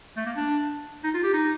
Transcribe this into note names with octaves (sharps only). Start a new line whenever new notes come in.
A3
A#3
D4
D#4
F4
G4
D#4